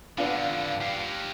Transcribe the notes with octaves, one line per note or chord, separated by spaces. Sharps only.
F2 D3 B3 D4 F4
G4 F5